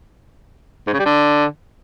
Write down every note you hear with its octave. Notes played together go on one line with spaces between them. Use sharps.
G#2
C#3
G3
D3